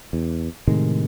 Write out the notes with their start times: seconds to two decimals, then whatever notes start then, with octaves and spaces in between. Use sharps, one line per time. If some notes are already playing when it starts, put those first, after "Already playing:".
0.13 E2
0.67 A2 C3 D#3 G#3